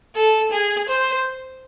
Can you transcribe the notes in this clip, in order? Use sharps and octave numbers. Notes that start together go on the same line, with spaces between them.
A4
G#4
C5